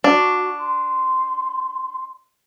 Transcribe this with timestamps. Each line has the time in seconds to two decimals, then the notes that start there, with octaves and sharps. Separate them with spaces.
0.04 D4 F#4
0.58 C6